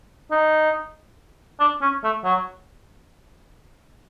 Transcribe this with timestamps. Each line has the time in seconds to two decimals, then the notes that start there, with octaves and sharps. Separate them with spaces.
0.31 D#4
1.60 D4
1.82 C#4
2.04 A3
2.25 F#3